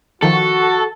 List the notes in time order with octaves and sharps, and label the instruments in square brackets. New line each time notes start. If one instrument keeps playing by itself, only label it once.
[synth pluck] D#3 F3 [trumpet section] F#4 [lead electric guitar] A4